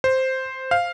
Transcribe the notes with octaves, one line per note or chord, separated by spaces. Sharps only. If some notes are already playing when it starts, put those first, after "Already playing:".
C5
F5